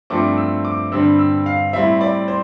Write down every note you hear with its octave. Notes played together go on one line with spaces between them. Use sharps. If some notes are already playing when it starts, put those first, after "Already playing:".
G2 F3 A3 C4 D6
E6
D6
G2 D3 G3 C4 E6
E6
F5
A2 G3 C4 E5
D5
C5